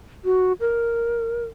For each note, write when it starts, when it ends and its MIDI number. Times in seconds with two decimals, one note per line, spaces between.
0.25 0.53 66
0.60 1.44 70